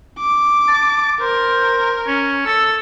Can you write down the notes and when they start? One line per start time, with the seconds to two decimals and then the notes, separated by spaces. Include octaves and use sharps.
0.19 D6
0.68 A5
1.21 A#4 C5
2.07 C#4
2.46 A4 E6